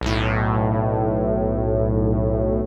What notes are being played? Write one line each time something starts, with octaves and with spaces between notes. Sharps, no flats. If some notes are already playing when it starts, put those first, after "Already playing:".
B1 A2